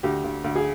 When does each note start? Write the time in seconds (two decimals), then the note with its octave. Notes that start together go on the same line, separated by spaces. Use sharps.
0.03 D2 G4
0.24 D2
0.44 D2
0.56 G#4